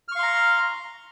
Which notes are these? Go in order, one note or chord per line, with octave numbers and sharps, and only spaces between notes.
F5 A#5 C6 C#6 F6